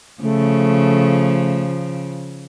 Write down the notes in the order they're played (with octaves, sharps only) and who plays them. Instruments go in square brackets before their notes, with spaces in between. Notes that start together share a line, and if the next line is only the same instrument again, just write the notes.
[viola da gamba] C#3 F3 [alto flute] A3